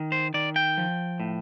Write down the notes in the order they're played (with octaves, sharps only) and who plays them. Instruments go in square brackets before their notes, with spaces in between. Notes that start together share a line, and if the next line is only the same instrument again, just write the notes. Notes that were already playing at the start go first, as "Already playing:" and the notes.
Already playing: [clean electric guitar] D#3
C5
D#3 D5
G5
F3
A2